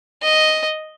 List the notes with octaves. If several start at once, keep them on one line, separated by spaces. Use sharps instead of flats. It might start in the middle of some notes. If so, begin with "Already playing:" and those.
D#5